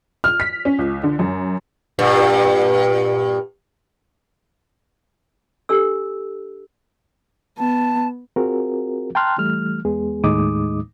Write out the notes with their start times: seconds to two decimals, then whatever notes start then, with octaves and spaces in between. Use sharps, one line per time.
0.24 F6
0.40 B6
0.65 C#4
0.79 C#2
1.03 D3
1.19 F#2
1.99 G2 A#2
5.69 D4 G4 A4 E6
7.58 B3 A5
8.36 C4 F4 F#4 G#4 A#4
9.15 G5 A5 A#5 C6 F6 F#6
9.38 E3 G3 A3 F6
9.85 E2 G#3 B3 G#4
10.24 D#2 A2 G#3 D#4 D6 D#6